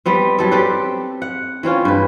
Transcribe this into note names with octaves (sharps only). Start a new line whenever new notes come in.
G3 B3 C4
F#3 G3 A4
C4 G4 A4 B4
F#5
E3 C4 C#4 F4
G2 B4